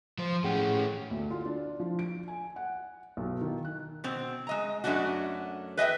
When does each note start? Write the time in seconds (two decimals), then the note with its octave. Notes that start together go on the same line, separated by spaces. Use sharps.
0.18 F3 C5
0.44 A2 C#4 G#4 F#5 G5
1.11 D2
1.31 F4
1.45 D4
1.80 F3
1.99 D7
2.28 G#5
2.56 F#5
3.17 B1
3.41 D#3
3.65 F#6
4.04 B2 C4
4.47 G#3 D#5 A#5
4.84 F#2 A3 C#4 D4 F#4
5.77 B4 D#5 E5 G5